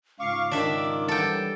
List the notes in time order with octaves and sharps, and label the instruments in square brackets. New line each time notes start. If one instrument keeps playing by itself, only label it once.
[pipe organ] G#2 C#3 F4 [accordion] F5 C#6 [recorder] D6
[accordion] D#3 [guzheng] D4 E5
[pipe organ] E3 G3 [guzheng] A4 G5